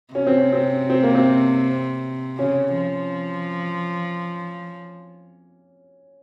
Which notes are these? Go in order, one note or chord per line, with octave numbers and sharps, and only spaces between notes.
C3 C#4
C4
C#4
C4
C4
A#3
C4
C#3 C#4
F3